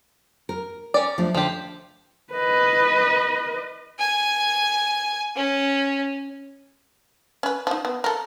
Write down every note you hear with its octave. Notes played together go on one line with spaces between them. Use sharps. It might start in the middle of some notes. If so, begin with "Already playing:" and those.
A#4
C#4 D5
F3 A3 D4
D3 F3 G4
B4 D#5
G#5
C#4
C#4 B4
F3 D#4
B3
A4 A#4